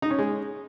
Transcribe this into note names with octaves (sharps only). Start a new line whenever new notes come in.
D#4
C#4
G#3